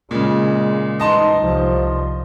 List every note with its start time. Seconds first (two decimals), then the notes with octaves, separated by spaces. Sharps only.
0.11 A#2 C#3 G#3
1.00 E3 D#4 D#5 A5 C6
1.39 C2 F3